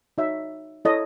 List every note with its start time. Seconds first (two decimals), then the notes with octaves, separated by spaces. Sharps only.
0.18 D#4 F#4 C#5 E5
0.85 E4 A4 C#5 D#5